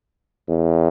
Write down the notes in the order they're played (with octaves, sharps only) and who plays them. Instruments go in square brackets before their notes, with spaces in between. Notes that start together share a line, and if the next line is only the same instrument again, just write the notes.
[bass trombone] E2